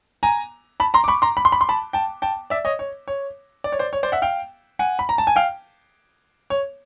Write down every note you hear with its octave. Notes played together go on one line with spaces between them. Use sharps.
G#5 A#5
A5 B5
A#5 C6
D6
B5 C#6
A#5 C6
B5
C6
B5
C6
A5 B5
G5 A5
G5 A5
D5 E5
C#5 D#5
C#5
C#5
D5
C#5
C5 D5
C#5
C5 D5
E5 F#5
F5 G5
F#5 G#5
B5
A#5
A5
G#5
F5 G5
C#5